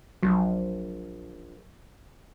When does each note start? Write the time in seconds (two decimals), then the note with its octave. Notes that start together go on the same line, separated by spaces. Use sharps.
0.23 A#1 F#3